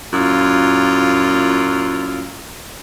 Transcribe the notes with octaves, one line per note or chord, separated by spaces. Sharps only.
F#2 A#2 E4 F4